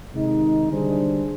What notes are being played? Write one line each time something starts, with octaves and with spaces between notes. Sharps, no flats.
C3 D#3 G#3 D#4
D3 G3 D4 G#4 C5